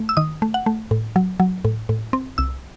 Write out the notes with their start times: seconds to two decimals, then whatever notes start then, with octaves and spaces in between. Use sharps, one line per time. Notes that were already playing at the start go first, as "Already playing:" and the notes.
Already playing: A3
0.09 E6
0.17 D#3 D#6
0.42 A3
0.54 F#5
0.66 A3
0.91 A2
1.16 F#3
1.40 F#3
1.65 A2
1.89 A2
2.13 C4
2.38 C2 E6